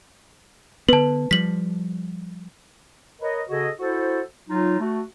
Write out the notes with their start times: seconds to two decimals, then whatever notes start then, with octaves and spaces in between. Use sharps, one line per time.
0.89 D3 B3 B4 A5
1.31 F3 G3 B6 F#7
3.20 A#4 B4 C#5 D#5
3.49 C#3 F#4 G#4 A4 D#5
3.79 E4 F#4 A4 C5
4.49 F#3 D#4 F4
4.79 A3 F#4